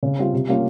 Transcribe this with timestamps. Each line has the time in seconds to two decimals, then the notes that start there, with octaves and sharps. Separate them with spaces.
0.03 C#3
0.18 G3 C4 F4
0.33 C3
0.48 G3 A#3 C#4 F4